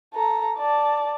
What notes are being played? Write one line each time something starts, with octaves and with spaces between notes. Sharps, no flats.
A4 A#5
D5 A5